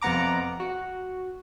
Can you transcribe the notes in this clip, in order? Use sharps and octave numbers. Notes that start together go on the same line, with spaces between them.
F2 C3 B3 F#5 A#5 D6
F#4